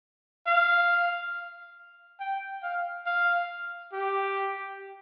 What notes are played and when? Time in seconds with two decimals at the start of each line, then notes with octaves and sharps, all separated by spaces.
0.47 F5
2.20 G5
2.63 F5
3.06 F5
3.93 G4